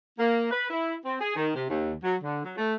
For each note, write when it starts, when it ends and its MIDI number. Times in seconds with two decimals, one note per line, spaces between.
0.19 0.48 58
0.51 0.68 71
0.70 0.96 64
1.05 1.16 60
1.21 1.35 68
1.36 1.51 51
1.55 1.68 48
1.70 1.94 39
2.03 2.16 54
2.23 2.43 50
2.44 2.57 54
2.57 2.75 57